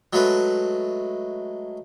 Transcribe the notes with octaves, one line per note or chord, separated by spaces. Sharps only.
F#3 G#3 A3 B4